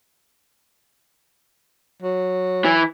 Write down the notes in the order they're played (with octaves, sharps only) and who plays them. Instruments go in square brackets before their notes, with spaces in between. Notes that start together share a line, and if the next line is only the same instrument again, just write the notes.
[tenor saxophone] F#3
[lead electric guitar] E3